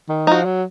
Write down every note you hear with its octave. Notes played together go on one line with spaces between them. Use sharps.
D#3
F3 D#4 F#4
F#3